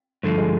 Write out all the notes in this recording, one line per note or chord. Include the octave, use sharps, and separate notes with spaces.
G2 D3 F3 A3
G#3